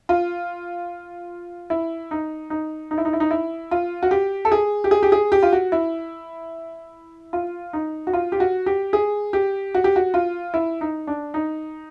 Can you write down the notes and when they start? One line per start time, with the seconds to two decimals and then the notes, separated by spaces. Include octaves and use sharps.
0.09 F4
1.70 E4
2.11 D#4
2.50 D#4
2.91 D#4
2.98 E4
3.05 D#4
3.13 E4
3.20 D#4
3.31 E4
3.71 F4
4.03 F#4
4.11 G4
4.45 A4
4.52 G#4
4.84 G4
4.91 G#4
5.03 G4
5.12 G#4
5.32 G4
5.43 F4
5.53 F#4
5.72 E4
7.33 F4
7.73 D#4
8.07 F#4
8.13 F4
8.32 G4
8.40 F#4
8.66 G4
8.93 G#4
9.33 G4
9.75 F#4
9.84 G4
9.96 F#4
10.14 F4
10.54 E4
10.81 D#4
11.07 D4
11.34 D#4